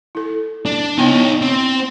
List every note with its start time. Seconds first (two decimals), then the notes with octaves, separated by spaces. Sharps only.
0.15 E4 A4
0.66 D4
0.98 B3 D#4 E4 C#5 G5
1.42 C4